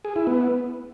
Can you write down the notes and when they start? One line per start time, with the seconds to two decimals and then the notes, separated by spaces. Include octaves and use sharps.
0.05 G#4
0.16 E4
0.27 B3